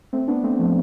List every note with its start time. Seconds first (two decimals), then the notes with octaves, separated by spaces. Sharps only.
0.13 A3 C4
0.28 B3 D4
0.43 A3 C4
0.59 F3 A3